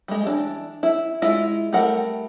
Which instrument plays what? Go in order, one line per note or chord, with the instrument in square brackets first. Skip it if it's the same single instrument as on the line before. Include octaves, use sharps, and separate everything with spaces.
[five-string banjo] G3 G#3
E3 D4
E4
G#3 E4 F4
G3 A3 A#4 F#5